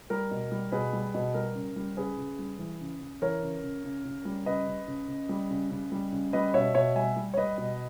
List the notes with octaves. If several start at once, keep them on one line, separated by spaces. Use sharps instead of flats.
G3 A#4
B2
G3
B2 G#4 B4
G3
B2
G3 A#4
C#3
G3
C#3 G#4 B4
C#3
G3
E3
C#3
C#3
E3 A#4 C#5
C#3
C#3
C#3
C#3
G3
C#3 B4 D#5
C#3
C#3
C#3
G3
C#3
C#3
G3
C#3
G3 B4 D#5
B2 C#5 E5
B2 C#5 E5
G3 E5 G#5
G3
C#5
G3 B4 D#5
B2